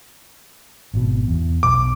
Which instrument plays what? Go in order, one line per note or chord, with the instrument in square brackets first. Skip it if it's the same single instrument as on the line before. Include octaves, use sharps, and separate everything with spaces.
[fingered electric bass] G#1 B2
E2
[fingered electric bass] B1 [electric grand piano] D6